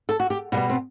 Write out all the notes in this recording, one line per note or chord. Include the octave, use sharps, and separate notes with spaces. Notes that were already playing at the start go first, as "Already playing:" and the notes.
A4
F#4
G4
B2 G3 B3 F#4
C4